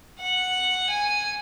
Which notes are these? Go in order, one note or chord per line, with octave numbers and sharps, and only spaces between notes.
F#5
G#5